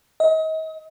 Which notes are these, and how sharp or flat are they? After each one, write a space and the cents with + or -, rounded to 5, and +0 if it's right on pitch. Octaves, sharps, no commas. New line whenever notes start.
D#5 +35